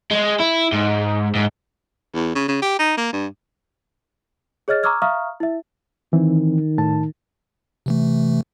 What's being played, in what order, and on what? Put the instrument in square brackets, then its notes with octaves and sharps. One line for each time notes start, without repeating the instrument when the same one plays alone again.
[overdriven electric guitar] G#3
E4
G#2
G#2
[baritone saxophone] E2
C#3
C#3
G4
D#4
A#3
G2
[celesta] G#4 C#5 D#5 F6 A6
A#5 C#6 D6 E6 F6 G#6
E5 F5 A#5 C#6 D#6 F6
E4 E5
[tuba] D#3 [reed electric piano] E3 C4
[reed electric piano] A2 A5
[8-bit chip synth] C3 E3 A3